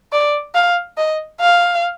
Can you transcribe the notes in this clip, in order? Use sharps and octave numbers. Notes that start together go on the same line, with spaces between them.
D5
F5
D#5
F5